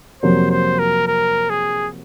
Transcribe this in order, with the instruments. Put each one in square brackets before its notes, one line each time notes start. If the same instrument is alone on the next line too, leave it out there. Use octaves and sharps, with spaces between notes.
[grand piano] F2 C3 F#3 A#3 [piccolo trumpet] C5
[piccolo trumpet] C5
A#4
A#4
G#4